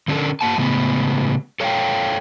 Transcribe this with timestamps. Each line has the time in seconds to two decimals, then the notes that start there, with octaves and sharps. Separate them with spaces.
0.08 D3 C#4 D4 E4 A4 A#4
0.41 A#3 F#5 A5
0.58 A2 C#3 G#3 B3
1.60 A4 C#5 E5 F5 G5